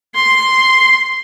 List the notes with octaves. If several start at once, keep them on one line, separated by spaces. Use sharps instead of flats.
C6